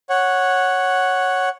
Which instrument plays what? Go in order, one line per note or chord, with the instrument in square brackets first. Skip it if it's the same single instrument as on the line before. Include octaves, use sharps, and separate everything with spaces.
[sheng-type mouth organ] C#5 F#5